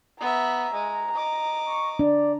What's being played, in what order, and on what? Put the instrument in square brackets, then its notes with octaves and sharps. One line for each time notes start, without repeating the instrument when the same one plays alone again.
[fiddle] B3 E5 [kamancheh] A#5
[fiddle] G#3
D#5 D6
[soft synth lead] C#6
[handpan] D4 [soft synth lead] D5